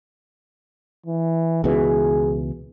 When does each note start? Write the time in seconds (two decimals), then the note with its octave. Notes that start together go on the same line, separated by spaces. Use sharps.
1.06 E3
1.64 C#2 B2 E3 G#4